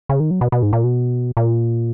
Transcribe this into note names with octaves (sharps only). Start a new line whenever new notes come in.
C#3
D#3
F#3
B2
B2
G#2
A#2
B2
A#2